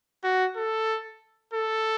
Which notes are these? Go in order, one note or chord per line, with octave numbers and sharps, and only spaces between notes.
F#4
A4
A4